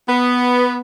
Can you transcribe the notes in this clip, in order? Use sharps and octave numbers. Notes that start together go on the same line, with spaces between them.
B3